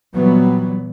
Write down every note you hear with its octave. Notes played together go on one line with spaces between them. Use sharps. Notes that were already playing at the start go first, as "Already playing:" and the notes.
A#2 E3 F#3 G3 B3